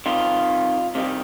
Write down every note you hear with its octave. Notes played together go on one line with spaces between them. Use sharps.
C3 D#3 G3 F4
C3 D#3 G3